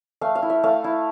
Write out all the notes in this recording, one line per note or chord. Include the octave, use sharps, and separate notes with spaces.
A3 F5
F5
E4
E5
A3 F5
E4